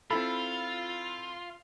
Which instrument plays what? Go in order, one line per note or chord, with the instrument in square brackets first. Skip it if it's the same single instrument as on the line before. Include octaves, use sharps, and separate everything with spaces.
[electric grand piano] C4 E4 A4 [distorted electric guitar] F4 [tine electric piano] B5